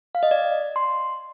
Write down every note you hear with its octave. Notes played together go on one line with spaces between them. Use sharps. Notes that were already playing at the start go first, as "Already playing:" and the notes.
F5
D#5
D5
C6